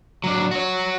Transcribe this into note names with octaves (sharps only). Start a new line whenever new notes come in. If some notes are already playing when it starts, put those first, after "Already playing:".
F#3 D4
F#4 C#5